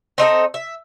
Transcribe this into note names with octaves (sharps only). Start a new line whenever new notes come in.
C4 D#4 A4 D#5
E5